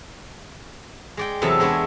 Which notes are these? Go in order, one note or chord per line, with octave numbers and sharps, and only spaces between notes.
G#3 D5 G5
E2 C3 F#3 B3 A4 A5
G#3 B3 D4 E4 C#5